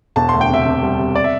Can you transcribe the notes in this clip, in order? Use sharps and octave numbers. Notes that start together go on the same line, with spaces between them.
E1 A5
D2 C6
G5
C3 E5
C3
G3
C3
D5
E5